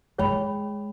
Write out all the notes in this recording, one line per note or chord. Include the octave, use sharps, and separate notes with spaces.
G#3 G#4 C#5 G5 B5